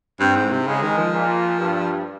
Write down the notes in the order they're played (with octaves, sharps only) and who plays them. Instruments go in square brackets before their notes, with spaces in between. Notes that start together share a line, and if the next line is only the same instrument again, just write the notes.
[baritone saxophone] G2 [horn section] C4
[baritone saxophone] G#2
C3
[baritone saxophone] C#3 [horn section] G#3
[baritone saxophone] D#3
F3
[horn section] A#2
G2